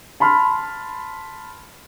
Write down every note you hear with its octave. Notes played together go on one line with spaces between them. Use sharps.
A5 B5 C6 F6